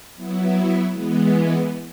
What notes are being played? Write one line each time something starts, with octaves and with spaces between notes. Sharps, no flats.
F#3 B3 E4
E3 G#3 B3